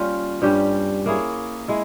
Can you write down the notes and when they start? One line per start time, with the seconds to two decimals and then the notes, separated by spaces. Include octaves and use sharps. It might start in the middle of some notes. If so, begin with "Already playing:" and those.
Already playing: G3 A#3 C#4 F4
0.42 G2 G3 C#4 G4
1.06 A#3 E4 G#4 C#5
1.68 G#3 E4